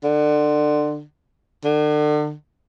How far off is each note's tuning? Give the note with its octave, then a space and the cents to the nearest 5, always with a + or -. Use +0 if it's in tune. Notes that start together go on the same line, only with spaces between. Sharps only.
D3 +25
D3 +35